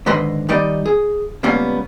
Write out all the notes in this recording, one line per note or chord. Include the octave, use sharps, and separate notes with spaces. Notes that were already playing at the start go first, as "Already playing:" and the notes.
G#2 D3 D#3 B4 D#5 C6
D#3 G3 D#4 D5 D#5
G#4
C#2 G3 A#3 B3 C#4